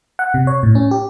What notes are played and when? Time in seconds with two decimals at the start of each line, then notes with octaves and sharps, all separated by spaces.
0.19 F#5
0.34 C3
0.47 C#5
0.63 A2
0.75 C#4
0.91 G4